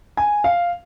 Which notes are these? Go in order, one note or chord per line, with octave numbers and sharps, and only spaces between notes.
G#5
F5